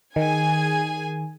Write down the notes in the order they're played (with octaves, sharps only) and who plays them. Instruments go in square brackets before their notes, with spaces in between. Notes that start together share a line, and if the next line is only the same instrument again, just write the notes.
[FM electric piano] D#3 [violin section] G#4 G#5